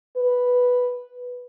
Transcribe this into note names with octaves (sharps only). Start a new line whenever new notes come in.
B4